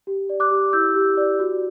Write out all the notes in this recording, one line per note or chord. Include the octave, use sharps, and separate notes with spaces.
G4
D5
D6 F#6
G4
E4 E6 G6
G4
D5
F#4